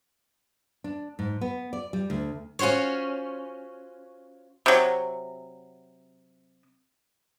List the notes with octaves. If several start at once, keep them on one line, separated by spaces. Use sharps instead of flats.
D4
G#2
B3
D5
G3
D2
C#4 F4 F#4 C5 C#5
C3 F#3